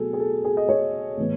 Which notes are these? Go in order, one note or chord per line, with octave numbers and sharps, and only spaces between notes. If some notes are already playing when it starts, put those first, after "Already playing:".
Already playing: B2 F#3 A3 G#4 A4
G#4
A4
G#4
D#5
C#5
A2 E3 B3